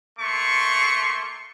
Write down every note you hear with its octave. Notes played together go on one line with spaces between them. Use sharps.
A3 A#3 C6 C#6